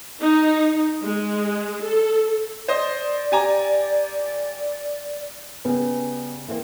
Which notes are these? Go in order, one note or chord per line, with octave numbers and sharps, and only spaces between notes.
D#4
G#3
A4
C5 D5 D#5
G4 G#5 A#5
C#3 G3 B3 G#4
E3 A#3 C4